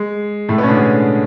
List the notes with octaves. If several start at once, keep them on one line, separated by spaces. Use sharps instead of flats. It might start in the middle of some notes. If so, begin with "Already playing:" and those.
Already playing: G#3
A2 A3
B2 B3
C#4
D3 D4
G#3 G#4